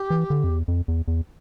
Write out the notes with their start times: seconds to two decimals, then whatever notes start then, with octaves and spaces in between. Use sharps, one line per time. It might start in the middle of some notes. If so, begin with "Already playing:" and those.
Already playing: G4
0.10 E3
0.30 D3
0.44 F2
0.49 E2
0.68 F2
0.88 E2
1.08 E2